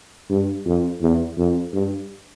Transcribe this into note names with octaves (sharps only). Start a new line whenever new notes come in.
G2
F2
E2
F2
G2